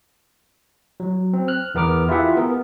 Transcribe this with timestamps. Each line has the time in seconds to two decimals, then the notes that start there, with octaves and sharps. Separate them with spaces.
1.00 F#3
1.33 C4
1.48 F6 F#6
1.75 E2 B3 A#4 D6 F6
2.09 E4 F4 G4 G#4 E5 F#5
2.37 B3 A#4